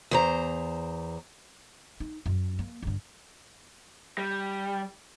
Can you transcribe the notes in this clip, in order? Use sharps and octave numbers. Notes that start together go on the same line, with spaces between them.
E2 C5 A#5
D#4
F#2
A#3
G1 D3
G3